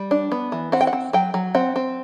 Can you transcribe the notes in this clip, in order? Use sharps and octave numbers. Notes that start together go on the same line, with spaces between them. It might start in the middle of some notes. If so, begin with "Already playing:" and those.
Already playing: G3
D4
B3
E3
C4 F#5
G5
F#5
C4
F#3 G5
F#3
C4 F#5
C4